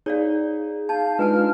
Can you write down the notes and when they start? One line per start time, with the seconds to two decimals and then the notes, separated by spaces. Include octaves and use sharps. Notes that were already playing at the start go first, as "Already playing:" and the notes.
0.06 D#4 G#4 C#5 D5 F5
0.89 D#4 F5 A5 G6
1.19 G#3 D4 D#4 F4 B4 G#5 A5 F6